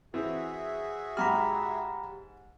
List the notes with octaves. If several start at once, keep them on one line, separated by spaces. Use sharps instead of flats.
E3 C4 F#4 G#4 E5
G#2 G4 A#5 B5 F6